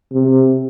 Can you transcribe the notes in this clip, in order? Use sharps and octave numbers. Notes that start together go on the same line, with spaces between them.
C3